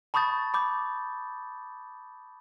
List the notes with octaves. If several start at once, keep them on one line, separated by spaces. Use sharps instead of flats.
A5 B5 C#6 D#6 G6 A6
B5 D6 G6